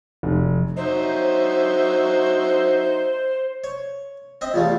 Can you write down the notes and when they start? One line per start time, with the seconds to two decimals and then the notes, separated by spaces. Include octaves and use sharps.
0.23 F1
0.77 F#3 D#4 C5 E5
3.64 C#5
4.41 C4 D#5 E5
4.54 E2 G3 A3 F4